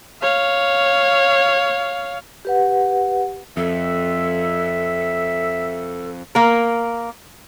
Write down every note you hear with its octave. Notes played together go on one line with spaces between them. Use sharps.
C#5 F5
G4 B4 F#5
F2 A4 E5
A#3 A#4